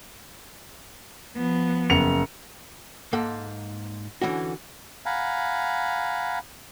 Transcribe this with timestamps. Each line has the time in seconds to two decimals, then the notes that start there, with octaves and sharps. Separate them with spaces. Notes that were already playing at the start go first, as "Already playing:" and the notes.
1.37 F3 B3
1.90 F#1 C#7 F7
3.13 G#2 A#3 A4 F#5
4.22 D3 E3 C#4 F#4
5.06 F5 F#5 G#5 A#5 B5